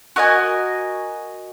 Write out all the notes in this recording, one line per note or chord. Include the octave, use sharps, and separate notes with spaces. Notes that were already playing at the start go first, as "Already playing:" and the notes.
F#4 A#4 D#5 G#5